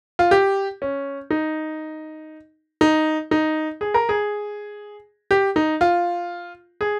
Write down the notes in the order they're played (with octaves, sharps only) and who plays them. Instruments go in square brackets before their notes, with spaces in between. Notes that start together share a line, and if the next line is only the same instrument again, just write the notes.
[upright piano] F4
G4
C#4
D#4
D#4
D#4
G#4
A#4
G#4
G4
D#4
F4
G#4